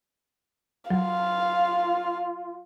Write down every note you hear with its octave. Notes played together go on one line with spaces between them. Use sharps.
F#3 F4 F5